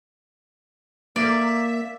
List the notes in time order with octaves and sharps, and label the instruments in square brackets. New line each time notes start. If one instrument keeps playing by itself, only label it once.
[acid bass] A#3 [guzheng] D5 [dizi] E5